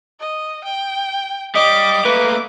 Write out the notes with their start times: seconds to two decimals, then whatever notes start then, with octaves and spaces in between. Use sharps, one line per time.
0.20 D#5
0.65 G5
1.55 G3 D#5 D6
2.05 A3 A#3 B4